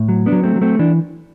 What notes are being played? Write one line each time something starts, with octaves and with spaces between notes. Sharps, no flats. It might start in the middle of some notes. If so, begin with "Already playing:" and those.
Already playing: A2
F#3
B3 D4
F#3
A3 C4
F#3
A3 C4
E3 D4